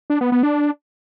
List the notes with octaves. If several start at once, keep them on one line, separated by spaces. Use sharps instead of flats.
D4
B3
B3
D4